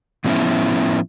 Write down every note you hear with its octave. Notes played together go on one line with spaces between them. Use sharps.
A2 F3 F#3 B3 C#4 E4